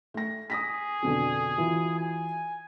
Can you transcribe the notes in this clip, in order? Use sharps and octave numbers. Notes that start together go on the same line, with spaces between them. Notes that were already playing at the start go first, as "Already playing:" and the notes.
A3 A#6
G#4 D#6 A#6 B6
F2 B2 D3
E3 F4 F#4
G#5